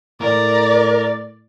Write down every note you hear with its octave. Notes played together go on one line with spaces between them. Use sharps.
A2 A#4 D5